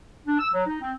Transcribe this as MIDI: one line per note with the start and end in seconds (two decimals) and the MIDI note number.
0.27 0.38 62
0.40 0.48 88
0.54 0.66 54
0.67 0.79 63
0.81 0.92 60